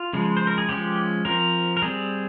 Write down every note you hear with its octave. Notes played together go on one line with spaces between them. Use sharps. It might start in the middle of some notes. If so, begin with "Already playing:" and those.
Already playing: F4
C#3 F3 G#3
C5
A#4
G#4
F3 G#3 C#4 G4
F3 C4 A#4
A#4
G3 C4 G#4